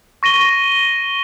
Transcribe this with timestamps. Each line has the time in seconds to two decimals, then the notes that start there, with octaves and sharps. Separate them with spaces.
0.23 C#6 A#6 D#7 G7